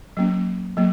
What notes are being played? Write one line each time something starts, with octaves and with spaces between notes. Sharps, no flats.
F#3 A#3 C#4
F#3 A#3